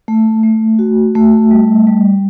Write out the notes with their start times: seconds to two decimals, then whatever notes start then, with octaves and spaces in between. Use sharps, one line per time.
0.08 A3
0.43 A3
0.79 F#4
1.15 A3
1.51 G3
1.87 G3